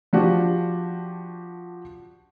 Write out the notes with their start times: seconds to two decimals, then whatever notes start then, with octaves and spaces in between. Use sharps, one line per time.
0.13 F3 D4 F#4 G4